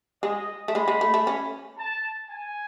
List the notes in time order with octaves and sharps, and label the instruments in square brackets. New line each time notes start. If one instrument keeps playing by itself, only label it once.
[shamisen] G#3 [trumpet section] D#5
[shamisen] A3
[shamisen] G#3 [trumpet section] B5
[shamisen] G#3
A3
A3
C#4
[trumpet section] A5
G#5